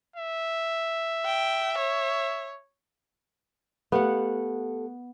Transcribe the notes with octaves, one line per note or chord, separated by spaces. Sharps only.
E5
G5
C#5
A3 B3 G4 F5 F#5